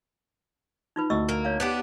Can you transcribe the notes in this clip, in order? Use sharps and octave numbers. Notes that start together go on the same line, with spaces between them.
D#4 F4 B4
D2 D#5 C#6 E6
A#3
C#5 F5
B3 D4 G4